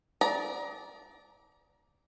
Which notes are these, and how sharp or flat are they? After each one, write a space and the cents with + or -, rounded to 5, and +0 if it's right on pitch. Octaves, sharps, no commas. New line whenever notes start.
D5 -10 A#5 +25